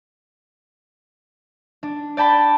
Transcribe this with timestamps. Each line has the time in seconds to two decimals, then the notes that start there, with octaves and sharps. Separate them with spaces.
1.83 D4
2.17 D5 G5 A5 B5